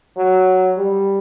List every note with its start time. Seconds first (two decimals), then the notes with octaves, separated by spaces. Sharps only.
0.17 F#3
0.77 G3